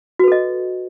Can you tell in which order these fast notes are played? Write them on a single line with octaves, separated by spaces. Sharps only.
F#4 B4 A4 D#5